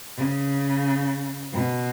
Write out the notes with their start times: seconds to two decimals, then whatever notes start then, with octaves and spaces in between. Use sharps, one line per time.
0.17 C#3
1.53 B2